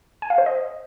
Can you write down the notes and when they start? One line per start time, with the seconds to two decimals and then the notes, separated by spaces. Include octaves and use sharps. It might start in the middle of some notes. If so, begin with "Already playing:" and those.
0.22 G#5
0.30 F5
0.38 C5
0.46 D#5